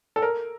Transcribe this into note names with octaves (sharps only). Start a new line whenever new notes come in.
A4
A#4